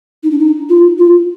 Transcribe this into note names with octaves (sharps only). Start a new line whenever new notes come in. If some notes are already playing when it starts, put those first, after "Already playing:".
D#4
D4
D#4
F4
F4